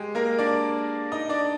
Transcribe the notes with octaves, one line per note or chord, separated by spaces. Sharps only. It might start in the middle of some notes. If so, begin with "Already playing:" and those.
Already playing: G#3 G4 G#4
A#3 A#4
D4 D5
D#4 D#5
D4 D5